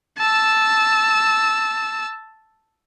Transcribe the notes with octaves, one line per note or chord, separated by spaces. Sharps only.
A5 E6